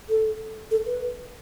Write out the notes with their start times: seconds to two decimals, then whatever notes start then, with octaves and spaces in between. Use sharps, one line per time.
0.09 A4
0.71 A4
0.86 B4